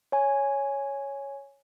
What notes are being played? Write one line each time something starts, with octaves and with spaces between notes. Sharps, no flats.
C#5 G#5